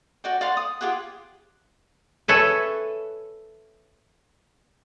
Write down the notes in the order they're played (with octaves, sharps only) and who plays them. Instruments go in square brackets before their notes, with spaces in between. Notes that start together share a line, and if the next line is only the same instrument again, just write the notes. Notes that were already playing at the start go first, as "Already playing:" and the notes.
[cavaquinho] F#4 D5 G5
D5 F5 F#5 C6
D#6
F4 G4 G#4 F#5
[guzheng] A4 B4 C#5 E5 G#5